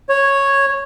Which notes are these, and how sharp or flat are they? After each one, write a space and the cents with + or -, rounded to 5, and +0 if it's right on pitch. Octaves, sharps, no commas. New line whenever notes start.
C#5 -5